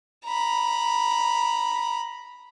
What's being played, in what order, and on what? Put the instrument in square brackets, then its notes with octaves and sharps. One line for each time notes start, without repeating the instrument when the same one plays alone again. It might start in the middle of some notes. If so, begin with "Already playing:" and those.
[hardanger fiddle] A#5 B5